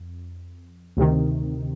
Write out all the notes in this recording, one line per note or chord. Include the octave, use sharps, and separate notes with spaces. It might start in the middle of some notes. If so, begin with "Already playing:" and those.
Already playing: F2
D2 C3 D#3